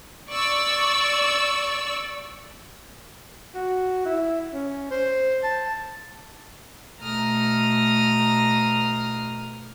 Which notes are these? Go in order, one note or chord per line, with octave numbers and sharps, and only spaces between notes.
D5 C#6 E6
F#4
E4
C#4
C5
A5
B2 A3 A#5 D#6 F6